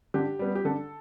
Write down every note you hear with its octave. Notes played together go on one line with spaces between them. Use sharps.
D3 G4
G3 B3
G4
D3 A4